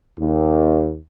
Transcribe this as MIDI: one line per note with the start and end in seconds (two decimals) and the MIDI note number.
0.19 0.95 39